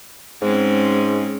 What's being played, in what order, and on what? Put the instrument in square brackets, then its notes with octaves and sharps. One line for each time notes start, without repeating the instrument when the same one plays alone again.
[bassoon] G#2 [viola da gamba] G#3 C4 C#4